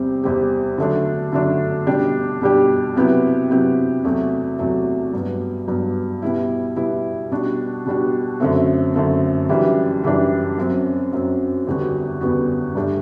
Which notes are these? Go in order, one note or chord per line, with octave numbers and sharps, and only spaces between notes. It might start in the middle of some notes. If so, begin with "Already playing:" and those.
Already playing: E2 C3 G3 C4 G4
E2 C3 G3 C4 G4
D3 F#3 A3 D4
D3 F#3 A3 D4
B2 G3 D4 G4
B2 G3 D4 G4
C3 F#3 B3 E4 G4
C3 F#3 B3 E4 G4
E2 C3 F#3 A3
E2 C3 F#3 A3
G2 F#3 B3
G2 F#3 B3
B2 G3 B3 E4
B2 G3 B3 E4
B2 G3 D4 F#4
B2 G3 D4 F#4
F#2 D3 A3 C4
F#2 D3 A3 C4
F#2 E3 G3 D4
F#2 E3 G3 D4
F#2 F#3 C4
F#2 F#3 C4
E2 D3 G3 B3 F#4
E2 D3 G3 B3 F#4
G2 D3 A3 D4 G4